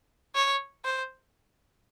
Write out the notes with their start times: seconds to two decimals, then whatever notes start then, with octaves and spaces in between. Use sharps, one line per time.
0.35 C#5
0.85 C5